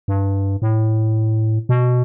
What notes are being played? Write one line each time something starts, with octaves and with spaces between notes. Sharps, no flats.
G2
A2
B2